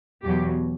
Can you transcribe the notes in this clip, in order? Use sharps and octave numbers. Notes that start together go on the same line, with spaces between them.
E2 B2 F#3 G4